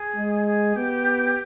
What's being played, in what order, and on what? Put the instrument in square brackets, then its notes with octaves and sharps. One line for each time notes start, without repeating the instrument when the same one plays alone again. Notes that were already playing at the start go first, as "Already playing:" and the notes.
Already playing: [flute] G#4
[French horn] G#3
[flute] G#4
[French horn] B3 [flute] G4